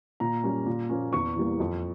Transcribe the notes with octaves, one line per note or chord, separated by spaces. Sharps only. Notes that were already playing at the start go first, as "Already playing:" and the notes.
A#2 A#5
G3 A#3 C#4
A#2
F3 A#3 C#4
E2 C#6
E3 G3 A#3
F2